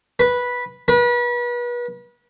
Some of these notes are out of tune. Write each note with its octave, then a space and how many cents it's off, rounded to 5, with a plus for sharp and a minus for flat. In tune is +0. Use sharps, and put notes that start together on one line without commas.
B4 -10
B4 -35